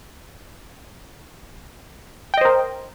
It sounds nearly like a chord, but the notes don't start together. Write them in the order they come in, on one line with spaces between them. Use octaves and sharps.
G5 D#5 C5 A#4